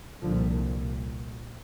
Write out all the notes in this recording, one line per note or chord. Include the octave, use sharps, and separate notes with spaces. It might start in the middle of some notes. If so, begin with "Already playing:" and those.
C2 A#2 D3 F3